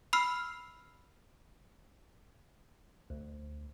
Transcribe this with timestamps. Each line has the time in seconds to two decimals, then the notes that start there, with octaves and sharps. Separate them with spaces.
0.13 B5 E6 F6 C7
3.10 D2